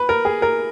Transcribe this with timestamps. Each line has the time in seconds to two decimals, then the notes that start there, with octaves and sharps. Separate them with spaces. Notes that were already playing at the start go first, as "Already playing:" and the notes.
Already playing: B4
0.09 A#4
0.25 G#4
0.42 A#4